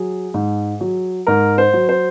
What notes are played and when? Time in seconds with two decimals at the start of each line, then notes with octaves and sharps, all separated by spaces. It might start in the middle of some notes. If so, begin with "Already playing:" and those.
Already playing: F#3 G#4
0.34 G#2
0.81 F#3
1.27 G#2 A#4
1.58 C5
1.73 F#3
1.89 C5